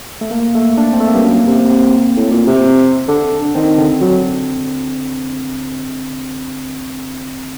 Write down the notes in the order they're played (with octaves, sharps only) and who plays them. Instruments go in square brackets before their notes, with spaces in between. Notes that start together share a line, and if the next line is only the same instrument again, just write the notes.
[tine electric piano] A3
A#3
A3
D4
C4
A3
A#3
[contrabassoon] G2
F#2
C3
[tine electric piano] C4
[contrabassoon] A2
A#2
C3
[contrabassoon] D3 [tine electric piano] D4
[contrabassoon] D#3 [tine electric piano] C4
[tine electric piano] D3
[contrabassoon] F#3